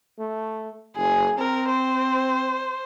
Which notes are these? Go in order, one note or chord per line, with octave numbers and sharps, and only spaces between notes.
A3
F#1 G#4
C4 A#4
C5